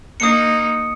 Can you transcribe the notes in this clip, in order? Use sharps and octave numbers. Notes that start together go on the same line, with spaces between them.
A#3 D#4 D#6 C#7